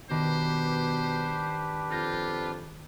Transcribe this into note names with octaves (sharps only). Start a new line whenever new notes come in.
B2 D#3 D4 G4 B4 C5
F2 F4 F6 G6 A#6